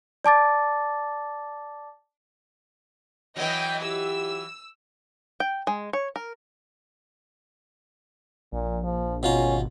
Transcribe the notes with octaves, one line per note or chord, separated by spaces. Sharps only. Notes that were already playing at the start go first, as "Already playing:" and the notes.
D5 A5 D6 A6
E3 F#3 D#5 G5
E4 F4 G4 E6
G5
G#3
C#5
A#4
A#1 A#2
F3
G#1 B2 C#4 F4 A#5